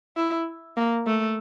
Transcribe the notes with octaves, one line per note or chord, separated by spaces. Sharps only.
E4
A#3
A3